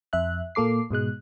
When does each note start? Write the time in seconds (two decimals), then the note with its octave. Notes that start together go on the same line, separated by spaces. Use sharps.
0.13 F2 E5 F#6
0.55 A#2 A#3 A4 D6 C7
0.91 G#2 B2 G#3 F#6